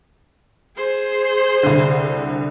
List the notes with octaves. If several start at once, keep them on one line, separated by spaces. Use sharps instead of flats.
G#4 C5
C2 D3